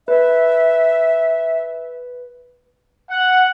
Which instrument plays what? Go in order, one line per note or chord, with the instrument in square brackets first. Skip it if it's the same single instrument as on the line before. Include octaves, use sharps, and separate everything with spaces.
[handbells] B4 [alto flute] E5
[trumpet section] F#5